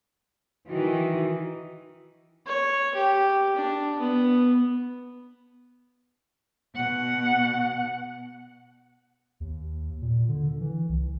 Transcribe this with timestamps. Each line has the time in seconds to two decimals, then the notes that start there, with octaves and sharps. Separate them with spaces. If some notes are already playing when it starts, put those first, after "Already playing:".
0.69 D#3 E3 F#4
2.46 C#5
2.95 G4
3.56 D4
3.99 B3
6.76 B2 F#5
9.40 D#2
10.02 A#2
10.28 D3
10.60 E3
10.89 C2